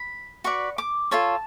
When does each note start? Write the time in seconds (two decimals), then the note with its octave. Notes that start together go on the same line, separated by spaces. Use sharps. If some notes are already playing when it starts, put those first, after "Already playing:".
Already playing: B5
0.44 F#4 B4 D5 C#6
0.78 D6
1.11 F4 A4 C#5 A5